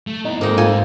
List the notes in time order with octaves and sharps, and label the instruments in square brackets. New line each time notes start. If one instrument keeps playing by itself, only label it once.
[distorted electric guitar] A3
[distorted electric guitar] B3 E4 [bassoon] D#4
[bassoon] F2 [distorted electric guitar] G#2 [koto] A#3 D#4
[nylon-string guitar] F4 [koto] A4 G#5